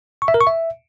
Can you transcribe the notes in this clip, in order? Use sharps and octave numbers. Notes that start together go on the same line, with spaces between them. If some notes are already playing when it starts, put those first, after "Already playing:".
C#6
E5
A#4
C#6
E5